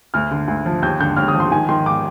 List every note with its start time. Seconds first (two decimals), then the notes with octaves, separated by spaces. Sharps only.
0.14 D2 F6
0.31 D3
0.48 D2
0.66 F3
0.82 D#2 G6
1.00 D3 G6
1.16 D#2 F6
1.28 D#6
1.34 F3
1.40 C6
1.51 D#3 G#5
1.69 D#3 C6
1.86 D6